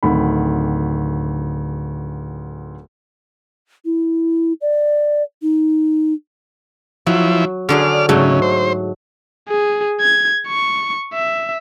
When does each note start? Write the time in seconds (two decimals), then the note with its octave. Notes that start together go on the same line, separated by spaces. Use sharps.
0.03 D1 D2 D#3 B5
3.85 E4
4.61 D5
5.42 D#4
7.07 F3 F#3 E4
7.69 D3 F#3 G#4 D5 F6
8.09 G#2 C#3 F#3 A3
8.42 C5
9.49 G#4
10.00 G#6
10.48 C#6
11.14 E5